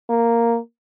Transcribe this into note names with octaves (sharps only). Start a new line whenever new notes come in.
A#3